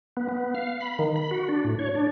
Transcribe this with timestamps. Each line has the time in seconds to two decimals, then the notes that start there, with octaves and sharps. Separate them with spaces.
0.17 B3
0.28 B3
0.55 F5
0.80 B5
0.99 D#3
1.16 B5
1.31 F#4
1.49 D4
1.65 A2
1.79 C#5
1.95 D4